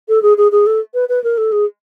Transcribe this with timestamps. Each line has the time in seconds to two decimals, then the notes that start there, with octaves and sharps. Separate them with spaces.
0.09 A4
0.22 G#4
0.37 G#4
0.52 G#4
0.66 A4
0.94 B4
1.09 B4
1.24 A#4
1.37 A4
1.52 G#4